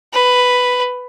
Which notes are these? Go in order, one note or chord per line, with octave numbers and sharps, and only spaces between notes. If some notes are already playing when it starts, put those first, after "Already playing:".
B4